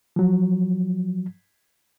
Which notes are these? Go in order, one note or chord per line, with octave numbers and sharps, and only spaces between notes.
F3 F#3